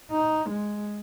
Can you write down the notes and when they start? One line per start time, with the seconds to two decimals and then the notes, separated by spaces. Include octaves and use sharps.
0.11 D#4
0.50 G#3